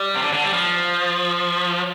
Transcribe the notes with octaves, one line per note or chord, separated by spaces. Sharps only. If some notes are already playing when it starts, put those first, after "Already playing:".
Already playing: G3
C3
D3
D3
G3
F3